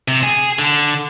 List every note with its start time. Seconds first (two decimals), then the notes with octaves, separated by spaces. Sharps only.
0.08 C3
0.23 G#4
0.59 D3